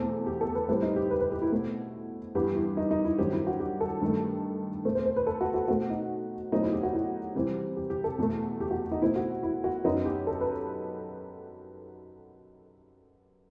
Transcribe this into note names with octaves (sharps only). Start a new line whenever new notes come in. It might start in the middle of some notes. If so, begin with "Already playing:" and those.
Already playing: E2 B2 A3 C4 A4
G4
A4
B4
A2 G3 C4 B4
D#4
G4
B4
B4
G4
E4
B2 A3 C4
G2 E3 G3 B3 G4
E4
D#4
D#4
E4
G2 D#3 F#3 C4 G4
E4
F#4
G4
A4
G2 D#3 A3
B2 A3 C4
C5
C5
B4
A4
F#4
F#4
B2 A3 C4 F#4
D#4
B2 F#3 A3 C4 D#4
E4
G4
F#4
E4
C3 E3 G3 C4
G4
G4
A4
E2 B2 A3
G4
F#4
D#4
B2 A3 C4 E4
F#4
E4
F#4
F#2 F#3 B3 D#4
G4
A4
B4